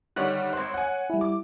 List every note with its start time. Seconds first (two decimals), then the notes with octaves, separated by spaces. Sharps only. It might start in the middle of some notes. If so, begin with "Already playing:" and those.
0.16 D3 D#3 G3 C#5 F#6
0.53 G#1 C5
0.74 F#5 G#5
1.10 G3 E4
1.21 D6